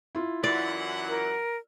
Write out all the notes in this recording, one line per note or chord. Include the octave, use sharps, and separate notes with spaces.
E4 F4
F#2 E3 D5 F#5
A#4